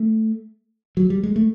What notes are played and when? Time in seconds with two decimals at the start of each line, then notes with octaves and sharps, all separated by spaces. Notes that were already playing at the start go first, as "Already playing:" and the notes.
Already playing: A3
0.97 F#3
1.10 G3
1.23 G#3
1.36 A3